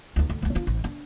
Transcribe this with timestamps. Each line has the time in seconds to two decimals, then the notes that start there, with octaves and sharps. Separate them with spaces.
0.16 D2 D#4
0.30 D2
0.42 D2 A3
0.55 D4 F4
0.67 A1
0.84 D4